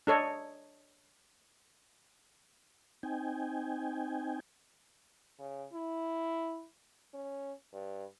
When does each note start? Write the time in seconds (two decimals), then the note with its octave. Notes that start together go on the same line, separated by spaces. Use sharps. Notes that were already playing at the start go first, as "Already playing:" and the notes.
0.07 D4 A4 C#5 D#5
3.03 C4 D#4 G5 G#5
5.39 C#3
5.73 E4
7.14 C#4
7.73 G2